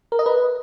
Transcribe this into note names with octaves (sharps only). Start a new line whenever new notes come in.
A#4
D#5
B4